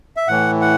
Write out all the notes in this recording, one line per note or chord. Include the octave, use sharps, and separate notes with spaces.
E5
A2 E3 F#5
F#5